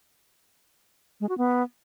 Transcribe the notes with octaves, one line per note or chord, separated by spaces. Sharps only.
G#3
F#4
B3